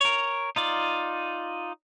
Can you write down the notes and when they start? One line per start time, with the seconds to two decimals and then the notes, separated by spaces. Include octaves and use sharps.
0.01 A#4 C#5
0.56 D#4 F4 D5